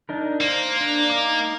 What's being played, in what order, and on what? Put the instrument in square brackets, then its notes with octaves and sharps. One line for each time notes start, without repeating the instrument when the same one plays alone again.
[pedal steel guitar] D4 D#4 A#4
[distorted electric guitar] A#3 [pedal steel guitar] C5
[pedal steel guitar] D4
D#4 D6